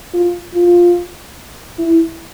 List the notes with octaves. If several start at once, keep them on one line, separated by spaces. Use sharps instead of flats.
F4
F4
E4